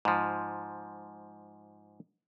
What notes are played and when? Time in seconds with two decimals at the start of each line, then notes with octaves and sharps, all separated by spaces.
0.05 G#2 F3